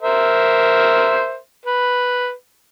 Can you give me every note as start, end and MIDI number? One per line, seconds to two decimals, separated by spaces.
0.02 1.37 70
0.02 1.37 72
0.02 1.37 76
1.66 2.32 71